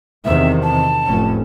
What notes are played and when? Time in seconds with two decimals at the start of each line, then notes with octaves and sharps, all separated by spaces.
0.25 E2 C3 D#3 E5
0.63 A5
1.06 F1 A2 C#4